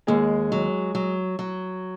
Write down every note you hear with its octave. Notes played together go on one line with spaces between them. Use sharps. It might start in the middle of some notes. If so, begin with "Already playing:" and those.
D#2 G#3 G#4
F#3
F#3
F#3